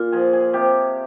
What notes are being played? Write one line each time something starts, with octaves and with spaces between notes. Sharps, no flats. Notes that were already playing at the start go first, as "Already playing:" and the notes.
Already playing: A#2
F3 G#4
G#4
C3 G4